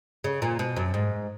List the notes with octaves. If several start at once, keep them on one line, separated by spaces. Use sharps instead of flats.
C#3
A#2
B2
F#2
G#2